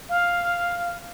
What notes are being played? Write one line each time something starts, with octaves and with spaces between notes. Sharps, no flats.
F5